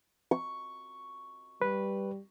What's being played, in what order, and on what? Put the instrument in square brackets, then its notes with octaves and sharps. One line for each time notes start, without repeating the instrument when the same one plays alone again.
[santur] C#6
[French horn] G3 [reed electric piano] B4